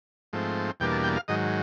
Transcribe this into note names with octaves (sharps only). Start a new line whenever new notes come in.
G#2 F3 A3 C4
E2 B2 G3 A#3 D4 G5
A5
G5
F5
G#2 D#3 F#3 D#5